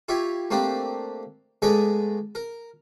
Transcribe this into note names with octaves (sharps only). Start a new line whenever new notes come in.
E4 F4 G4 C#5
A3 A#3 C4 D4 G4
G#3 A3 B3 G#4 D5 D#5
A#4